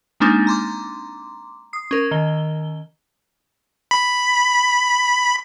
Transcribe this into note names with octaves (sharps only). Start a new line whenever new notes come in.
G#3 A#3 C4 D4 D#4
A#5 C6 D6
D#6 C7
C#4 A#4
D#3 G7
B5